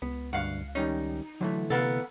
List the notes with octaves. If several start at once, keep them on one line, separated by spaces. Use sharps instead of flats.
C#2 B3
D2 G2 F5 F#5
D#3 G3 C#4 D#4
D3 E3 F#3 A3
C3 A#3 B3 A4